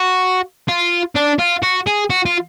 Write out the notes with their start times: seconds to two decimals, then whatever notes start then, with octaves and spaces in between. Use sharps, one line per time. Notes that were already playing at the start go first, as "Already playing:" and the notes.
Already playing: F#4
0.68 F4
1.15 D4
1.39 F4
1.63 F#4
1.87 G#4
2.10 F#4
2.26 F4